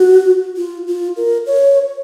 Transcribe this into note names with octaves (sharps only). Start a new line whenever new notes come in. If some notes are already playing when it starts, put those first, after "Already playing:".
Already playing: F#4
F4
F4
A#4
C#5